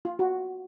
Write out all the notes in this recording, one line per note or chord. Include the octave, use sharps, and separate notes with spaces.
F4
F#4